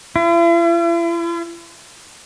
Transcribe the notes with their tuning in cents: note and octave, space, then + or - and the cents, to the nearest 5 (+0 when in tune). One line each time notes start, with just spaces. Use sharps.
E4 +45